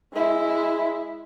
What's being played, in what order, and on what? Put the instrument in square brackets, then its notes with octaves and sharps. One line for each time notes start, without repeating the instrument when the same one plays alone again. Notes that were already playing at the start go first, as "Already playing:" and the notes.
[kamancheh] G#3 E4